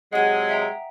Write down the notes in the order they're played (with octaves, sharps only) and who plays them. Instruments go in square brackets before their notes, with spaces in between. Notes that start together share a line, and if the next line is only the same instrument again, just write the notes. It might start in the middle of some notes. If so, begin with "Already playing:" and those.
[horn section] C3 F#3 G#3 [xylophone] F#5 D#7
[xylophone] E5 G5 A#5